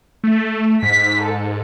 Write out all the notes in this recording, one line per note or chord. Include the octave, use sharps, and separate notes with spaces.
A3
G#2 B6
A4